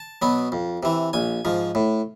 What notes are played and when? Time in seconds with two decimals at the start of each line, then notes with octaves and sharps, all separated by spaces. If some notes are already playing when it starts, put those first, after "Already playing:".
Already playing: A5
0.22 B2 F#3 B3
0.52 F2
0.83 C3 E3
1.13 A#1 G#5
1.45 G#2 F3
1.75 A2